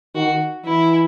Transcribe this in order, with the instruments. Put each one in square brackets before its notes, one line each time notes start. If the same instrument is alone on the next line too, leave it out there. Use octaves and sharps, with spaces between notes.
[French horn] D#3 [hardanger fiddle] F#4
[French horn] E3 [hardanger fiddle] E4